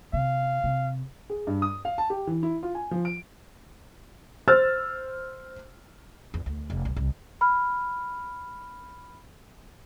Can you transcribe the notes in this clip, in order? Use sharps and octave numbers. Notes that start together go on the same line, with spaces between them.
C3 F5
C3
G#4
G2
D#6
F5
A5
G4
E3
E4
F4
G#5
F3
D7
C5 E6 F6 A6
E2
D2
F1
B1
C2
B5 F6